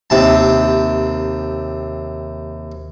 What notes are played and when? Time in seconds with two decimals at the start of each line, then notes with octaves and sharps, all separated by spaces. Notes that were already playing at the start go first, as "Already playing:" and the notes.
0.10 D#2 C3 A5